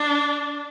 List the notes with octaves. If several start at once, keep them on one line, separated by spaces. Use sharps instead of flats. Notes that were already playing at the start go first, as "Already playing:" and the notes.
Already playing: D4